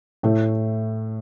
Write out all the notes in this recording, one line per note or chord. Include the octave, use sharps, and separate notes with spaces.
A2 A3